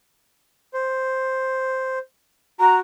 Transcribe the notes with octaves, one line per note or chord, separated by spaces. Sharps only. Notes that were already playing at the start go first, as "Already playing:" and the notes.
C5
F#4 A#5